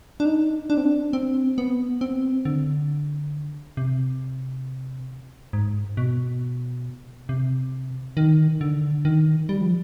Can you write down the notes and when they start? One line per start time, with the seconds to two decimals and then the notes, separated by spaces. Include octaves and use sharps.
0.20 D4
0.26 D#4
0.70 D4
0.77 C4
0.85 D4
1.13 C4
1.58 B3
2.01 C4
2.45 D3
3.77 C3
5.53 G#2
5.97 B2
7.29 C3
8.17 D#3
8.61 D3
9.05 D#3
9.49 G3
9.61 F3